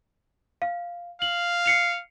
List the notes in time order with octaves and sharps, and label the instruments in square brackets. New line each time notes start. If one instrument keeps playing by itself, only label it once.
[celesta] F5
[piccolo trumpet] F5 [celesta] F#7
[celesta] C7 C#7 F7